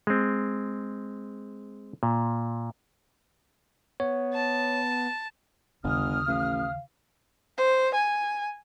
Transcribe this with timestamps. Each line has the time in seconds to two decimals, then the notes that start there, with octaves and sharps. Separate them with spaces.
0.07 G#3 C4
2.03 A#2
4.00 B3 C#5
4.34 A5
5.84 G1 D#2 C#3 D#6 F6
6.28 A1 F5
7.58 C5
7.94 G#5